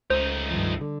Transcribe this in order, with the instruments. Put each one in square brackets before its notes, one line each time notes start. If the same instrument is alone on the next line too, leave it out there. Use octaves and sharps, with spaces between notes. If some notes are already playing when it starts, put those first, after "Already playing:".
[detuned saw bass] C#2 [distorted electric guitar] A3 D#4 [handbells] C5
[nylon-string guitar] G2 D#3 F3
D3